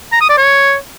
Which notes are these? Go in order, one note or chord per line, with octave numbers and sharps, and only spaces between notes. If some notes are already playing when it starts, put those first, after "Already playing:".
A#5
D#6
D5
C#5